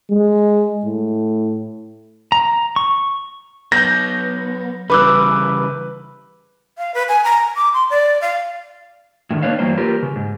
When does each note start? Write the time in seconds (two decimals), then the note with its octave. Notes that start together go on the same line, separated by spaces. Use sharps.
0.10 G#3
0.85 A2
2.32 A#5
2.76 C#6
3.72 F#3 B3 G6 A#6
4.90 C#3 E3 G3 B4 B5 D6 E6 F#6
6.78 F5
6.94 B4
7.08 G#5
7.24 A#5
7.56 D6
7.73 C6
7.90 D5
8.21 F5
9.31 A2 D3 D#3
9.42 A#3 D4 D#4 B4 C#5 F5
9.59 G2 E3 F#3 G3 A#3 C5
9.77 F4 G4 A#4 B4
10.02 C#3
10.16 G#2